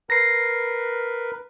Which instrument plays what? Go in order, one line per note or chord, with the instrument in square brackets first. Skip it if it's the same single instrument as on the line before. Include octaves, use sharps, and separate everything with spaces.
[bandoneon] A#4 B4 [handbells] A#6 C7